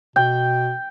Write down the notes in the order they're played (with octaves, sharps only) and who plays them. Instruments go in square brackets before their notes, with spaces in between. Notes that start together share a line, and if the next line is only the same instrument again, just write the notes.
[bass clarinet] B2 [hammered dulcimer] G5